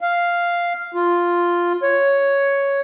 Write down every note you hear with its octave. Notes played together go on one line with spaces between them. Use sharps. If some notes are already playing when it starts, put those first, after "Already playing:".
F5
F4
C#5